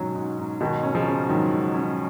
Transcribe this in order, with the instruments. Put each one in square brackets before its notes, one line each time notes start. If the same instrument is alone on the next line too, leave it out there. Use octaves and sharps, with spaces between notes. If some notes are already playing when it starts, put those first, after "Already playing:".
Already playing: [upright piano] G#2 F#3 C#4 [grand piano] B2 D#3
[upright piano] G#2
G#2
[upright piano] G#2 [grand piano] B2 D#3
[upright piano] C#4
[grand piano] C#3 F3
[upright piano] C#4
[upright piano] G#2 [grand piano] D#3 F#3
[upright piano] G#2
C#4